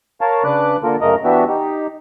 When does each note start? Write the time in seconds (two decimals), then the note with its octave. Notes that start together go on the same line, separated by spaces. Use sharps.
0.21 A#4 C#5 F5 A5
0.44 C#3 D4 B4 D6 F#6
0.83 D3 A#3 F4 A4 A#4
1.01 F#2 C#3 A3 A#4 D#5 A#5
1.24 E3 B3 D4 F#4 G4 E5
1.48 D#4 G4